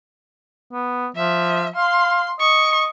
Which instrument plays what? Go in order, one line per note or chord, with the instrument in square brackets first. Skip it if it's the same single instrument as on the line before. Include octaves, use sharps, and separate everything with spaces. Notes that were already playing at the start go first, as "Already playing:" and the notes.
[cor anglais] B3
[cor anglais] F3 [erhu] E5
[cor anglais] F5 [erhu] C6
[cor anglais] D#5 [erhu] C#6